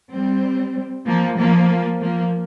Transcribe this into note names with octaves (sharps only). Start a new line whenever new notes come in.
G3 C4
F3 A#3
F3 A#3
F3 A#3